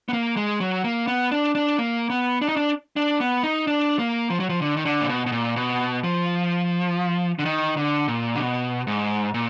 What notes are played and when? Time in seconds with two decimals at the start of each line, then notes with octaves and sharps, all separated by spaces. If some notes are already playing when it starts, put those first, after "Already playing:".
0.09 B3
0.13 A#3
0.36 G#3
0.60 F#3
0.84 A#3
1.07 B3
1.31 D4
1.55 D4
1.78 A#3
2.10 B3
2.41 D4
2.49 D#4
2.56 D4
2.96 D4
3.20 B3
3.43 D#4
3.67 D4
3.99 A#3
4.30 F3
4.40 F#3
4.49 F3
4.62 D3
4.77 D#3
4.85 D3
5.01 A#2
5.09 B2
5.26 B2
5.32 A#2
5.56 B2
6.04 F3
7.39 D3
7.45 D#3
7.77 D3
8.08 A#2
8.35 D3
8.39 B2
8.87 G#2
9.34 A#2